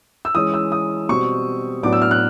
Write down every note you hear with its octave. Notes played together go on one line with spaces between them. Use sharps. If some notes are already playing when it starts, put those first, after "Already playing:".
E6
E3 G#3 C#4 D#6
E6
D#6
B2 G3 C4 C#6
A2 F#3 B3 D4 D6
E6
F6
F#6